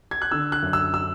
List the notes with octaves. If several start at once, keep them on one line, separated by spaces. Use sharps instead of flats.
G#6
F#6
D3 E6
F#6
F#2
E6
E6